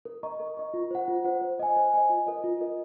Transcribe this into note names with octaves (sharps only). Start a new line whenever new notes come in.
A#4
D#5 A#5 C#6
A#4
D#5 A#5 C#6
F4
C5 F#5
F4
C5 F#5
C5
D#5 G#5
C5
D#5 G#5
F4
A#4 D#5
F4
A#4 D#5